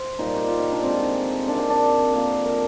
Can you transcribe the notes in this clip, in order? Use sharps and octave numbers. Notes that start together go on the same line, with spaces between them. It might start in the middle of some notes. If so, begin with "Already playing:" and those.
Already playing: C5
A#2 G3 A#3 D#4
G4
F4
D#4
D4
D3 G#3 C4
F4
D#4
C3 D#3 A#3 D4
C4
D4
D3 F3 A#3
A#4